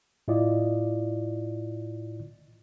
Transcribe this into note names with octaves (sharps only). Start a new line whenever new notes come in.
A2 E4 F4 D5 D#5